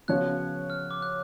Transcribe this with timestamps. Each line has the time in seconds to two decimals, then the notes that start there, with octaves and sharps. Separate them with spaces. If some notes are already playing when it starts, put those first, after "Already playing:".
0.08 C#3 F3 B3 F#4 C#5 F#6
0.70 F6
0.91 D6
1.02 F#6